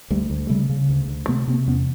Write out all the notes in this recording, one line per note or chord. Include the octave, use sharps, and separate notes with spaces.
D2 G3 A3
D2
C#3 G3 A3
C#3
D2
D2
C3 A3 B3
C3 A#3 C4
E2 B3 C#4